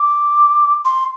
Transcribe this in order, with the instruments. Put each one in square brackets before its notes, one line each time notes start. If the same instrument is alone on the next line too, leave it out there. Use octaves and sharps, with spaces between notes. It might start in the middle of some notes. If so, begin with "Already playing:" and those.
Already playing: [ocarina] D6
C6